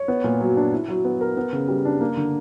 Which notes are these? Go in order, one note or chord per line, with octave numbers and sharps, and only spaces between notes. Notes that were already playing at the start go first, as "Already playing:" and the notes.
Already playing: C#5
B3
A#2
F#3
D4
E4
F#3
B3
A#4
B3
C#3
G3
D4
A#3
D3